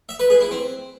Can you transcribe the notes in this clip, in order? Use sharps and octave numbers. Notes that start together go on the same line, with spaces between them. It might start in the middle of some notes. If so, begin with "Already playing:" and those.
E5
B4
G#4
E4
C4